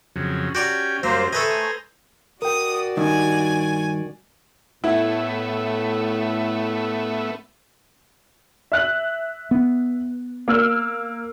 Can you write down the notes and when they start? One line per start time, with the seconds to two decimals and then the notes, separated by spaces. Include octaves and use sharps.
0.16 F2 C#3 F#3
0.55 C#4 F#4 G4 D5 G5 A#5
1.03 F#2 F#3 G3 A#3 C5
1.33 A3 A4 B4 C5 D#5 G#5 A#5
2.42 F#4 A#4 D5 G5 D#6
2.97 G2 D#3 G#5
4.84 A2 A3 B3 E4 E5
8.72 E5 F#6 F#7
9.51 B3
10.48 A#3 E6 F6